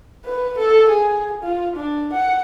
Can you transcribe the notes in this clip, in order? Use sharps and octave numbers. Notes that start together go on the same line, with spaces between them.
B4
A4
G#4
F4
D4
F#5